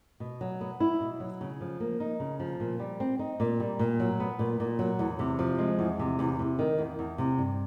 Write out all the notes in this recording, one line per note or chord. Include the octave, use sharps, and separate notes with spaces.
B2
F#3
B3
E4
B2
F#3
C#3
F3
A#3
D#4
C#3
F3
A#2
G3
C4
D#4
A#2
G3
A#2
F#3
B3
A#2
A#2
F#3
E2
C3
F3
G#3
E2
C3
E2
C3
D#3
E2
E2
C3
G2